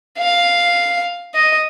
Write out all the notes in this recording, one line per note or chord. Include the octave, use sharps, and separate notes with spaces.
F5
D#5